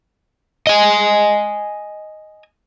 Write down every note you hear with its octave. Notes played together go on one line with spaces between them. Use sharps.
D#5 G#5